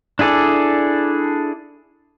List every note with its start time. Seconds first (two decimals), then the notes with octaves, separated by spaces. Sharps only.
0.19 D4 E4 G#4 A4 D5